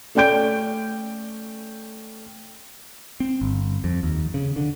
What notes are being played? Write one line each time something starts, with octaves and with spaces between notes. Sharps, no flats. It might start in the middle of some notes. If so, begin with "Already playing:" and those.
A3 C#4 D5 G5 G6 D7
C4
G1
F2
D#2
C#3
D3